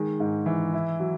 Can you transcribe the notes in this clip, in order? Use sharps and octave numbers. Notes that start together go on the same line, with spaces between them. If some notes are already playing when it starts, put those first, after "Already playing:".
Already playing: D#3 G#3
G#2
E3
E4
F#3